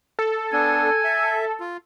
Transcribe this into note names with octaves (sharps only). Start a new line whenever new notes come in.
A4
B3 D4 G#5
E5
F4